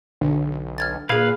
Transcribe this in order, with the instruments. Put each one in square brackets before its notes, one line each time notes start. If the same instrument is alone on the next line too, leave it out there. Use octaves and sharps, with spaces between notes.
[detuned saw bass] B1 [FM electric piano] D3
[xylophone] F6 G#6 A6
[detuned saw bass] A#2 [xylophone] G#4 G#6 [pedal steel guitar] B4 F5